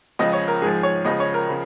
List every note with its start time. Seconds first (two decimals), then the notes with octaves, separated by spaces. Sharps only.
0.19 C#2 C#3 F3 D#5
0.33 C#5
0.48 A#4
0.62 G#2 F3 G#4
0.83 C#5
1.05 C#2 C#3 F3 D#5
1.20 C#5
1.34 A#4
1.49 C#3 F3